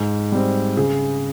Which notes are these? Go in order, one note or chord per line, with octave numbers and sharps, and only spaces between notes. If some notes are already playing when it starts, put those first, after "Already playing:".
Already playing: G#2
G3 C4
C#3 G#4